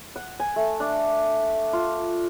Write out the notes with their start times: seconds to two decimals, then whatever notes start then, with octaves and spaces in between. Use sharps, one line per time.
0.16 F#5
0.40 G#5
0.56 A3
0.80 D4
1.73 F4